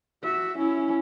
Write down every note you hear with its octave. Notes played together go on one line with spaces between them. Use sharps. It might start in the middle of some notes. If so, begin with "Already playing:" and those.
F#4 E5
C#4 E4